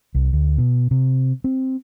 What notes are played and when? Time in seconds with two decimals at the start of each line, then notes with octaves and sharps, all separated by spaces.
0.14 C2
0.33 D2
0.58 B2
0.91 C3
1.44 C4